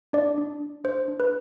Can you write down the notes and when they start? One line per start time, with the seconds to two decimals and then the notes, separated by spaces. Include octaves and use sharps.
0.13 D4 D5
0.38 D4
0.60 D4
0.84 D4 C5
1.08 D4
1.20 B4